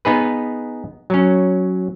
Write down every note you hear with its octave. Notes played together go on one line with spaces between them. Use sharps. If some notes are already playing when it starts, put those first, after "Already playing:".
B3 D#4 G#4 B4
F#3 C#4